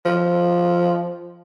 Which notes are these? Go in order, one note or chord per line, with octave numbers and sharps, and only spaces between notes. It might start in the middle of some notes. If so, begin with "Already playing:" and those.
F3